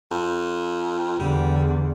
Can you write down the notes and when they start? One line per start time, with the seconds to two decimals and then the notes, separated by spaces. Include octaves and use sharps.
0.11 F2
1.20 E2 D3 G3